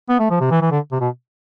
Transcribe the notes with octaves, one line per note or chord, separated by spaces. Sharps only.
B3
A3
F3
C3
E3
E3
D3
C3
B2